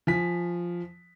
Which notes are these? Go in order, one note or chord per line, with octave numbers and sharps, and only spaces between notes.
F3 G#5 B6